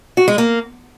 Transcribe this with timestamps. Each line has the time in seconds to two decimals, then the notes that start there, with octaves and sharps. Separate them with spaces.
0.17 F#4
0.28 G#3
0.38 A#3